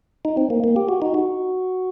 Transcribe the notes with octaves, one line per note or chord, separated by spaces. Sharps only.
D#4
C4
A#3
A#3
G4
F#4
D#4
F#4